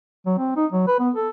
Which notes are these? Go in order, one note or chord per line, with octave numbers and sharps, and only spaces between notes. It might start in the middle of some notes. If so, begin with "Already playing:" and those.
F#3
C4
D#4
F#3
B4
B3
A4